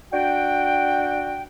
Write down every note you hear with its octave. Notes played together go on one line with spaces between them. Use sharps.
D4 F#4 F#5 G5